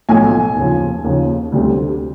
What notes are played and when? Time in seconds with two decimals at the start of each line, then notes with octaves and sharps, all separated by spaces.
0.09 B1 A2 F3 G#5
0.56 D#2 C#3 F3
1.04 D#2 C#3 F3
1.52 D2 D3 G3 C4